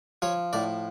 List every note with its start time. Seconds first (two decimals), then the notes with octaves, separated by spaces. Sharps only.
0.22 F3 C#5
0.53 A2 D5